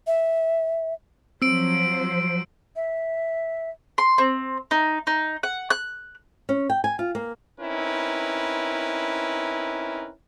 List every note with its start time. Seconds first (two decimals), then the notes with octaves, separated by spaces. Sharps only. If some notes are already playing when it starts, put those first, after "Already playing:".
0.07 E5
1.42 F3 F#3 C4 C5 E6 D7
2.76 E5
3.98 C6
4.18 C4
4.71 D#4
5.07 D#4
5.43 F#5
5.70 F#6
6.49 C#4
6.70 G5
6.84 G#5
6.99 F4
7.15 A#3
7.60 C4 C#4 D#4 E4 A#4 B4